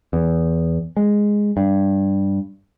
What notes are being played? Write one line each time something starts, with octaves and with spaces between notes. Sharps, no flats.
E2
G#3
G2